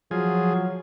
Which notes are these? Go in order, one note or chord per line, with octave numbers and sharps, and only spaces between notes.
F3 F#3 G#4